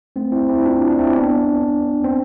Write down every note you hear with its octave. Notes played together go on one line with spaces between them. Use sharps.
A3 C4
C4 E4
C4 E4
D4 F4
D4
C4 E4
B3 D4
C4